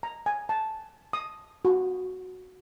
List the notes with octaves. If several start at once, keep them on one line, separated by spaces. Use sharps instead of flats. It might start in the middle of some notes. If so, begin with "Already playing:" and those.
A#5
G#5
A5
D#6
F#4